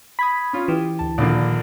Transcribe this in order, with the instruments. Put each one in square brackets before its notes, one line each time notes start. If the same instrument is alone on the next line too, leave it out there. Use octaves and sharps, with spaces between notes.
[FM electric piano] B5 [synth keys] D#6 G#6 B6
[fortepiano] C#4 F4
[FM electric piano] E3 [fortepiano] G4
[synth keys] D2 A5
[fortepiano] A#1 D3 A#3 [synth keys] A#2 D#3